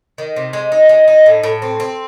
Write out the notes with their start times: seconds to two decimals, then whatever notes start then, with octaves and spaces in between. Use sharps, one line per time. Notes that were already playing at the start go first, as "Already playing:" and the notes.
0.18 D#3
0.36 C3
0.53 G#3
0.72 D#4
0.89 G#3
1.08 D#4
1.26 A2
1.43 A2
1.62 C4
1.80 C4